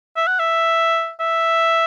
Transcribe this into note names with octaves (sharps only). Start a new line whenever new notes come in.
E5
F#5
E5
E5